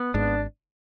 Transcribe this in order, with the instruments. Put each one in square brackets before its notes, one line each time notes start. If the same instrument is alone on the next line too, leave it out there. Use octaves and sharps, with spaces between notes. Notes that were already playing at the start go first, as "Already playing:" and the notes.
Already playing: [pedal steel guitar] B3
[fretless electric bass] G#1 G#2 [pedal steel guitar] D4